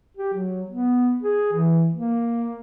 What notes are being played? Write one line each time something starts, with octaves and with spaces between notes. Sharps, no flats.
G4
F#3
B3
G#4
E3
A#3